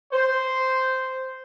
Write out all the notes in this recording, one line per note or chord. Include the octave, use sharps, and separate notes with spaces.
C5